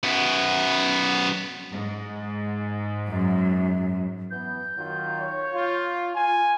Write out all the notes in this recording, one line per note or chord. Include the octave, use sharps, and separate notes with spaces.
F#2 B3
G#2
F#2
E3 B3 G6
D#3 F#3 F4
C#5
F4
F4 G#5